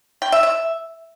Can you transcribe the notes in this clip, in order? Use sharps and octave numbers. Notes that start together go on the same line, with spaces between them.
G5
E5
E5